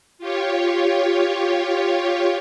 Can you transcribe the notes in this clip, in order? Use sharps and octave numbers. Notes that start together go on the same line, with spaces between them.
F4 G4 C#5